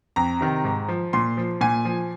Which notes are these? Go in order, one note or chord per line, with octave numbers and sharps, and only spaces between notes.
F2 A#5
C3 D#3
G#2
F3
A#2 C6
F3
A#2 G#5
F3